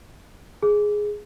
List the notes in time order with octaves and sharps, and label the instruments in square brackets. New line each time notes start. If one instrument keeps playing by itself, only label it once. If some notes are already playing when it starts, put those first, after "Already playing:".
[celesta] G#4